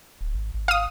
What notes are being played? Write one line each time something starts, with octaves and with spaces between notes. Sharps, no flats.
D1
G#1
G#1
F5 D#6